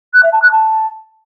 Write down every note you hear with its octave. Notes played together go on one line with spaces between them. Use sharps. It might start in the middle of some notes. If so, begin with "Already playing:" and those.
F#6
E5
A5
F#6
A5